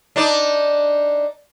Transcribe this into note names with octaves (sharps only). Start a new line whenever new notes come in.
D4 D#4 D5